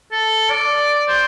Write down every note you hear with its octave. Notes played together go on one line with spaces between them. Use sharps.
A4
D5
C5